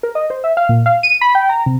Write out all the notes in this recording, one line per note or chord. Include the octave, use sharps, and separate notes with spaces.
A#4
D#5
C5
E5
F5
A#2
F5
D#7
B5
G5
A#5
C3